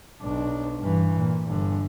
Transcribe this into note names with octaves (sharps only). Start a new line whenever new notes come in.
B1 D4
G2 E3
A#2
G1 D3